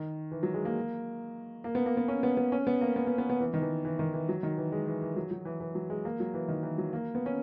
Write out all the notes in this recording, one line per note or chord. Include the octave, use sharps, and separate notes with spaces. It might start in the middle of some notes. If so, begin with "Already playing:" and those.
Already playing: D#3
E3
F#3
G#3
A#3
A#3
B3
A#3
B3
C#4
B3
B3
C#4
B3
A#3
B3
B3
B3
B3
E3
D#3
E3
E3
D#3
E3
F#3
D#3
E3
G#3
E3
E3
F#3
F#3
E3
E3
F#3
G#3
A#3
F#3
E3
D#3
E3
F#3
A#3
B3
C#4